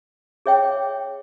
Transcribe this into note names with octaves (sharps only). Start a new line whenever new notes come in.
G#4 C#5 E5 G5